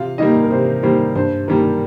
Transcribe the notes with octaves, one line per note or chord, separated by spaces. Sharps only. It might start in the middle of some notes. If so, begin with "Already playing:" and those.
Already playing: C3 F4 F5
D#3 G3 A#3 D#4 D#5
A#4
C3 C5
D#3 G3 A#3 C5
G2 C5
D#3 G3 A#3 A#4